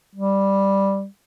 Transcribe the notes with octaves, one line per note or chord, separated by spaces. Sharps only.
G3